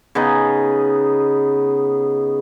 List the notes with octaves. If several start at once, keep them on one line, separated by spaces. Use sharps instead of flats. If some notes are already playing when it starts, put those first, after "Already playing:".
C#3 B3 D#4